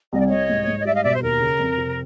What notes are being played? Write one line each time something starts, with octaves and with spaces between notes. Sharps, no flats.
C2 D#5
D5
C2 C#5 D#5
G#2
G#2
D#5
G3 D5 E5
D#5 F5
B2 D5 E5
C5
D#2 A#4
C#3
F2
C3